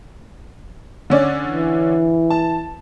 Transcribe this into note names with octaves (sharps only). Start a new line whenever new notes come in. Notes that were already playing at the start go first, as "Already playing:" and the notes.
D3 C#4 D5
E3
A5